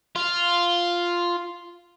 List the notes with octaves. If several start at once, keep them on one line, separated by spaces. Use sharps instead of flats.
F4